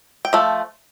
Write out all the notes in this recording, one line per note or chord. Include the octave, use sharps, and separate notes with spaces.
G5
F3 A3